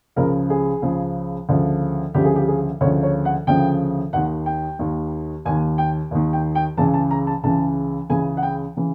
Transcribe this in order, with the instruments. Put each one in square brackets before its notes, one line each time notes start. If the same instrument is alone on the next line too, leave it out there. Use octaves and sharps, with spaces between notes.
[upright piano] C#2 C#3 F3 A#4
G#4
C#2 C#3 F3
D2 C#3 F3
D2 C#3 F3 G4
G#4
G4
G#4
D2 C#3 F3 C#5
C#5
F#5
D2 C#3 F3 G5
D#2 D#3 F#5
G5
D#2 D#3
D#2 D#3 G#5
G5
D#2 D#3
G5
G5
C#2 C#3 E3 A5
A5
A#5
A5
C#2 C#3 E3 A5
C#2 C#3 E3 G#5
F#5
G5
C#3 E3